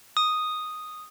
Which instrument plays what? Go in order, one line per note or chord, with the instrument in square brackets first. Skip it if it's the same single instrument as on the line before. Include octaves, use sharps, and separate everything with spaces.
[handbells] D#6